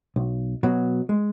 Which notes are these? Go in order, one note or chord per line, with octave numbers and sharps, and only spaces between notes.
B1
B2 F#3
G#3